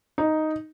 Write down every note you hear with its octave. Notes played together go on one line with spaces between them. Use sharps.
D#4